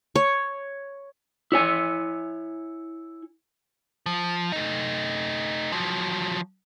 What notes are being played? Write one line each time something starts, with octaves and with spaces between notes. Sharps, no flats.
C#5
E4 C#5 G#5
F3
A3 D#4
F3 F#3